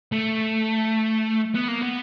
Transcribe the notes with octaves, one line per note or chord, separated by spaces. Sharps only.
A3
B3
A#3
B3